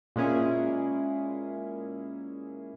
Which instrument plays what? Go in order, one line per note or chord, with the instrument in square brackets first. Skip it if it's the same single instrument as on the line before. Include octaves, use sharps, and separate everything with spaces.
[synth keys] A#2 G#3 A#3 C#4 E4 G#4